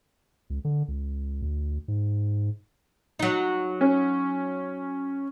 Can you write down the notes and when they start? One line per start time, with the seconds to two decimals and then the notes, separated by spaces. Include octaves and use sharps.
0.50 C#2
0.65 D3
0.88 C#2
1.42 D2
1.88 G#2
3.19 F#3 D#4
3.81 C#4